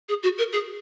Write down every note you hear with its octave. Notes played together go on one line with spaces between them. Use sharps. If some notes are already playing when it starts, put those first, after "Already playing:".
G#4
F#4
A#4
G#4